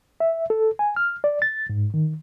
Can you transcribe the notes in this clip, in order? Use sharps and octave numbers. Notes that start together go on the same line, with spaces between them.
E5
A4
G#5
F6
D5
A6
G#2
D#3